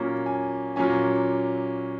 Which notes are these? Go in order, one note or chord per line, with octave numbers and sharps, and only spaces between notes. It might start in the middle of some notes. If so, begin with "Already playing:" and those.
Already playing: A#2 F#3 A#3 C#4 A#5
G#5
A#2 F#3 A#3 C#4 G#5